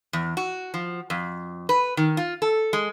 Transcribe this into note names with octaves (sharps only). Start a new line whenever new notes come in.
E2
F#4
F3
F2
B4
D#3
F4
A4
G#3